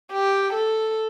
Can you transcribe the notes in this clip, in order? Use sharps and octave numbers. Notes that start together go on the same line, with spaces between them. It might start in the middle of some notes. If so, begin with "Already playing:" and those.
G4
A4